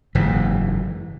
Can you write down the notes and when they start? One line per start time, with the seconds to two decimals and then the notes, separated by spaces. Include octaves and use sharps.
0.15 F#1 G#2 E3